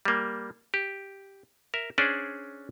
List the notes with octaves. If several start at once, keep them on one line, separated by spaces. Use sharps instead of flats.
G3 A#3
G4
A#4 E5
C#4 D4 G#4 C5 D5